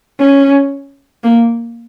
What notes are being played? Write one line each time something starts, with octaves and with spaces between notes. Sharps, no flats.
C#4
A#3